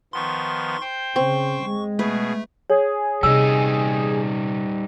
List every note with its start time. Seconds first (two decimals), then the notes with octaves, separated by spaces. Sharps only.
0.13 D#3 F3 B3 C6 C#6
0.81 C5 G5 G6
1.16 C#3 C4 C#6
1.64 G#3
1.99 B2 A3 G#4 B4
2.70 G#4 C#5
3.23 C3 G3 D#4 G#5 E6